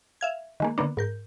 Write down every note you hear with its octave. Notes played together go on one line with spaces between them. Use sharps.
E5 F5 G#6
D#3 G#3 A#3
D3 A#3 B3 D4
G#2 A#4 G6